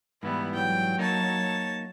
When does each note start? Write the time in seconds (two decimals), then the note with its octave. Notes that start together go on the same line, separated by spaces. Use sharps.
0.23 G#2 E3 G3 B3 E4
0.55 F#3 G5
0.99 A#3 D#4 C#5 A5